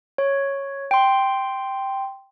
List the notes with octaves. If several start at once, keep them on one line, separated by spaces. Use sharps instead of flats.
C#5
G5 C6